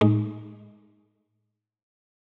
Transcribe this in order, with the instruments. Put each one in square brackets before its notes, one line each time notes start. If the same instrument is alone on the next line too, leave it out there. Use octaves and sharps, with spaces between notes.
[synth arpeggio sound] A2 G#3 D#4